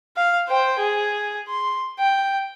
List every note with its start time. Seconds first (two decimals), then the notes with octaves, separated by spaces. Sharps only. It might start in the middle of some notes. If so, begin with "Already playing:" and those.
0.16 F5
0.48 C5 G5
0.79 G#4
1.48 C6
1.99 G5